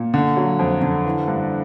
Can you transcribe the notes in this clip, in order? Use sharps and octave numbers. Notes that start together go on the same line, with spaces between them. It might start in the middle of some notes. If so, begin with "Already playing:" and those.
Already playing: A#2
D3
F#3
F2
D3
E3
G2